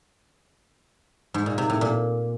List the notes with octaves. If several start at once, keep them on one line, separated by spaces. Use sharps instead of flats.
G#2
A#2
C3
A2
A#2